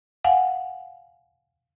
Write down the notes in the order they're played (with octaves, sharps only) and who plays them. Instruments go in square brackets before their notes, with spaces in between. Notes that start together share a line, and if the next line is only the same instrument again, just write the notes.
[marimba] F5 F#5 G#5